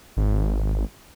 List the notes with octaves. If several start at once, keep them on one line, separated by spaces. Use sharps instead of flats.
G#1